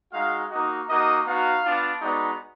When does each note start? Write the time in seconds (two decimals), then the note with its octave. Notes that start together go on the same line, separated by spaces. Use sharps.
0.12 G#3 D#4 F#4 F5
0.50 A#3 D#4 F#4 D#5
0.88 A#3 D#4 F#4 D#5
1.26 B3 D#4 F#4 F5
1.64 B3 D4 F4
2.01 G#3 B3 D#4 F#4 D5